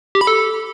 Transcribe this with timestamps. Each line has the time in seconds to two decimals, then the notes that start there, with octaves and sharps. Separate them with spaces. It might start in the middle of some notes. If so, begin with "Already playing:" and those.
0.15 G4
0.21 B5
0.27 A4